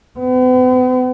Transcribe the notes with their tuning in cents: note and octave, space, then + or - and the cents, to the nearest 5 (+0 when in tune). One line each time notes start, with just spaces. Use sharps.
B3 +45